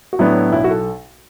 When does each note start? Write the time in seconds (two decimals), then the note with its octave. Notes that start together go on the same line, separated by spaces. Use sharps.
0.13 F#4
0.19 A2 F#3 B3 D4 E4
0.52 B1 E4
0.64 F#4
0.70 A4